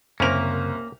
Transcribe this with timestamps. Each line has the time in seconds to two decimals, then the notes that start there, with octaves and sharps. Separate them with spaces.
0.20 C2 F#2 C#3 A#3 C#4 A#4 C5 F7